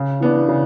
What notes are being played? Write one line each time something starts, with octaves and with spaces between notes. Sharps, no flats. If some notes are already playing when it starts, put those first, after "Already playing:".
Already playing: C#3
E3 B3 D4
C#3